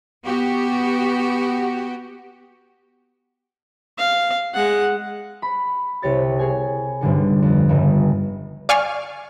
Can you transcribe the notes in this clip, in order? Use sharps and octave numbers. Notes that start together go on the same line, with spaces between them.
B3 F#4 G4
F5
G#3 F#5
B5
C2 G4 C#5 A6
G#4 C#5 G#5
B1 G2 D3 A4
F2
G1 C#2
D5 F5 G#5 C#6 F6